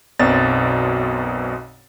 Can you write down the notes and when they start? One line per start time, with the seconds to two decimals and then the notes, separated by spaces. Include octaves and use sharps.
0.19 B1 F#2 B2 C4 D5 A6